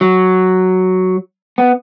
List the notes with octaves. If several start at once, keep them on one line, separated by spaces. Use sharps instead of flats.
F#3
B3